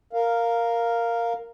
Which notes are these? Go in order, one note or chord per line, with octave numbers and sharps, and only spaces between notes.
A#4 F5